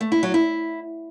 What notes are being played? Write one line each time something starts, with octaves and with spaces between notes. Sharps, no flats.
A3
E4
F#3
E4